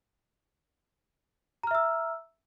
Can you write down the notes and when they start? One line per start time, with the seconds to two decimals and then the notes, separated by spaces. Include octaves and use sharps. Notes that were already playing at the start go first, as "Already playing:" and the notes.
1.63 A#5
1.67 F6
1.71 E5
1.75 E6